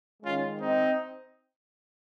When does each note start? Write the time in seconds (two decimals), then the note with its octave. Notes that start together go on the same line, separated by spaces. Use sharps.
0.23 D#3 G#3 C#4 F4
0.59 C4 D#4